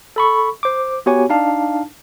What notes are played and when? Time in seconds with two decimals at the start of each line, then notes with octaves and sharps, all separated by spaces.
0.16 A4 B5 C#6
0.63 C5 D6
1.06 B3 F#4 G4 C#5 G#5
1.29 D4 D#4 F5 A5